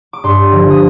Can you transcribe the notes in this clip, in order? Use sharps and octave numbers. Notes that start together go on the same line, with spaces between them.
D6
G2 C6
D3 F3
D#6